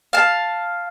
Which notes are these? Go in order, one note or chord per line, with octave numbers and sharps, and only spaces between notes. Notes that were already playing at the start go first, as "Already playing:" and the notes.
F5 A5